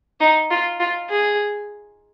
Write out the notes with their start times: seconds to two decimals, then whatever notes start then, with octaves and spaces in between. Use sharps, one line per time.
0.20 D#4
0.51 F4
0.80 F4
1.10 G#4